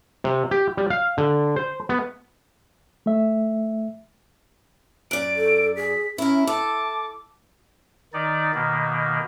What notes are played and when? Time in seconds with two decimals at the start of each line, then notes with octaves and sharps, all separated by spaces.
0.24 C3
0.51 G4
0.77 G3
0.90 F5
1.18 D3
1.56 C5
1.89 B3
3.06 A3 E5
5.11 F#2 D5 D7
5.36 A4
5.77 G#4 B6
6.18 C#4 E4 A#4 E5
6.47 A4 A5 D6
8.13 D#3 D#4 D5
8.54 B2 D#3 A#3